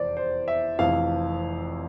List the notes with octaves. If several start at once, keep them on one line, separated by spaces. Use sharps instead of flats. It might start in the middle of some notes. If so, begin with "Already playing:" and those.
Already playing: F1 E2 E3 C5 D5
C5
E5
F1 F2 E3 F5